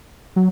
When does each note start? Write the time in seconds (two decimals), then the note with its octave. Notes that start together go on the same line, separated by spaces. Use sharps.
0.36 F#3